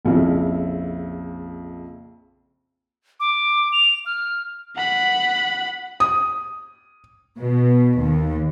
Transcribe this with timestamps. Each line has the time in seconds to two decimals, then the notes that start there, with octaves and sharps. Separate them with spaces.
0.05 A#1 F2 C#3 E4 E5
3.20 D6
3.73 F7
4.06 F6
4.76 F#5 B5
6.00 D#6
7.38 B2
7.99 D#2